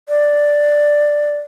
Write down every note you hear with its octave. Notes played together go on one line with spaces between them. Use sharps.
D5